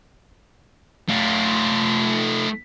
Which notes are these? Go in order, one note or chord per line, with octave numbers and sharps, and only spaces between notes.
A3 F4